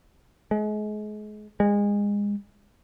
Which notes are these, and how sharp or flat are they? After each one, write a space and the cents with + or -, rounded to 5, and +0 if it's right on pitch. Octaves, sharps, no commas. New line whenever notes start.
G#3 +35
G#3 -25